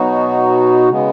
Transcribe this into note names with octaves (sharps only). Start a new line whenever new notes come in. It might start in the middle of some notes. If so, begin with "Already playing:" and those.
Already playing: B2 F#3 B3 D#4 F#4
C#3 G#3 B3